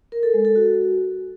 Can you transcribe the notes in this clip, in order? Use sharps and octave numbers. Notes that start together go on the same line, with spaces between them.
A#4
A4
G#3
A4
F#4